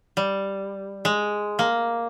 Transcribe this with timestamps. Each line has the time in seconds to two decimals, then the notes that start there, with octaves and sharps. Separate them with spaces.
0.17 G3
1.05 G#3
1.59 A#3